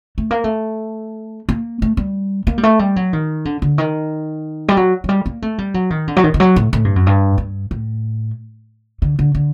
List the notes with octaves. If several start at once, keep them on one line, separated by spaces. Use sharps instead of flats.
A3
A#3
A3
A#3
A3
G3
A#3
G3
A3
G3
F#3
D#3
D3
D3
D#3
G3
F#3
F#3
G3
A#3
A3
G3
F#3
D#3
D3
F#3
D#3
D#3
F#3
A2
A2
G2
F#2
G2
G2
A2
D3
D3
D3